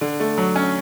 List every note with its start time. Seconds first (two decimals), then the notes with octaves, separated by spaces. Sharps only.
0.01 D3
0.20 A3
0.38 F#3
0.56 C#4